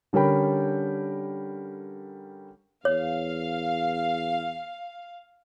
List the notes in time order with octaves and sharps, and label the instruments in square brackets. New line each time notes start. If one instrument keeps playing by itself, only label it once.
[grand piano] D3 G3 C#4 A#4 G5 B5
[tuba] E2 [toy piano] C#5 [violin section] F5